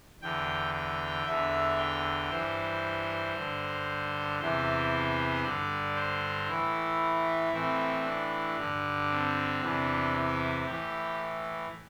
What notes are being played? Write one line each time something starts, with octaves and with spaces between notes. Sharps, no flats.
E2 D3 G5
G5
E2 D3 E5
G5
G2 E3 C5
G2 D3
E2 C3 E3 C5
G2 D3 D5
C5
A2 E3 E4
A2 E3 C4
D4
G2 D3
C4
E2 C3 E3 D4
E4
A2 E3 G4